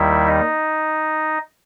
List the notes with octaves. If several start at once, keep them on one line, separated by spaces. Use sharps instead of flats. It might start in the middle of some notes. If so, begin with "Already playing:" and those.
Already playing: D#2 D#3 G3 E4 E5
D#4 D#5